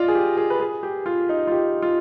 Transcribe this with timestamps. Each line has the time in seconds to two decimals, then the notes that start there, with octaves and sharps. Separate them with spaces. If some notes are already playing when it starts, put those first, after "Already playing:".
Already playing: F4 D5 D#5
0.08 G#4
0.15 G4
0.37 G#4
0.50 B4
0.60 G#4
0.83 G4
1.06 F4
1.29 D#4
1.47 F4
1.52 G4
1.82 F4